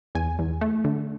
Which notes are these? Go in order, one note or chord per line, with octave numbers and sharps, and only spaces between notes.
E2 G#5
E2
A3
D3